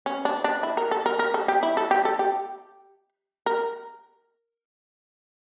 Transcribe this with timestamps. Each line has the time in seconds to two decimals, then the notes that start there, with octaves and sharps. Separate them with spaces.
0.06 C#4
0.25 D4
0.44 D4
0.63 E4
0.77 A#4
0.91 A4
1.06 A#4
1.19 A#4
1.34 A4
1.48 G4
1.63 E4
1.77 A4
1.91 G4
2.05 A4
2.19 G4
3.46 A#4